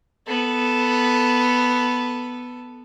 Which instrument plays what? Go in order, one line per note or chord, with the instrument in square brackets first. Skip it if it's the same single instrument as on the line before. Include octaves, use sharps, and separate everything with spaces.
[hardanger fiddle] B3 A4